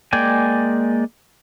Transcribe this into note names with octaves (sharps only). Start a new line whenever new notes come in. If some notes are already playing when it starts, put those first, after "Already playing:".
G#3 A#3 D5 G5 G#5